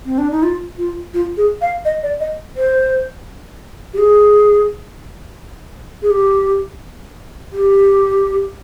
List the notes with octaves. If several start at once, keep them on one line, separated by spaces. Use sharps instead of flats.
C4
D4
D#4
F4
F4
F4
G#4
F5
D#5
D5
D#5
C5
G4
G#4
G#4
G4
G4